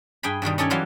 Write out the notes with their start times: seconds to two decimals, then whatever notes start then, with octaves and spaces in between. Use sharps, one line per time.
0.23 G2 G#4 G5 G#5 B5
0.42 G2 B2 D#3 G3
0.58 C#4 D#4 A4 D5 G#5
0.70 E3 F#3 G3 F5 C6